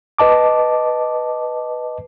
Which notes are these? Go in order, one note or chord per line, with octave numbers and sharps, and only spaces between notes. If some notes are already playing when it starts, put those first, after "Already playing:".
B4 D#5 A5 D6